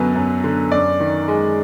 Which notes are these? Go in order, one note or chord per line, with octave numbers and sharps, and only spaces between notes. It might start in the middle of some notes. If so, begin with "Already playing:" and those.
Already playing: F#2 D3 F#3 B3
F#2
D3
F#2 D5
D#3
G#3